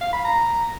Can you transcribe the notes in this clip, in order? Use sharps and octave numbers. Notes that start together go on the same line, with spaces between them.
F5
B5
A#5